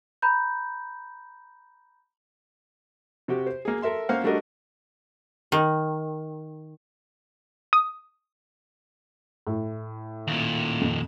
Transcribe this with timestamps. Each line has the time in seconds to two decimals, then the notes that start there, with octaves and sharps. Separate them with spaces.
0.22 A#5 B5 G6
3.28 C3 F#4 G4
3.47 C5
3.65 A#3 G#4
3.82 A4 A#4 E5 C6
4.09 A#3 C#4 C5 F5 F#5
4.24 G3 A3 D4 F#4 A#4 D#5
5.52 D#3
7.73 D#6
9.47 A2
10.28 D#2 A#2
10.81 F2